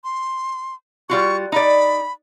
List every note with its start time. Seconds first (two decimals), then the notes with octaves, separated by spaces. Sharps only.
0.04 C6
1.10 G3 F4 F#4 C#6
1.52 D#4 D5 B5